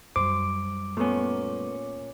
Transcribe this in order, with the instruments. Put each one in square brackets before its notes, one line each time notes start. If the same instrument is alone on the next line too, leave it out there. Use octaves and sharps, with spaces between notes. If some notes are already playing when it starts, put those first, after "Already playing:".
[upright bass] F#2 G3 [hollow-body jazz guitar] C5 [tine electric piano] D6
[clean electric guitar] A#2 C#4 [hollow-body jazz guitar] A3 B3